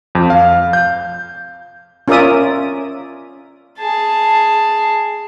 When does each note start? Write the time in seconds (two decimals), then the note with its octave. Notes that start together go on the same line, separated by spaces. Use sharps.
0.15 F2
0.30 F5
0.73 G6
2.08 C#4 F4 A#4 D5 E5 D#6
3.79 G#4 A5